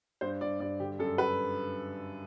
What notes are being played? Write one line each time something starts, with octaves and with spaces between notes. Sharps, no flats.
G2 C5
G2 D5
G2 D5
D3 G4
F#2 A4
B4